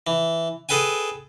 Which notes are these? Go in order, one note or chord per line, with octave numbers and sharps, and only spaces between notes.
E3
G#4 A4 B4 G5 G#5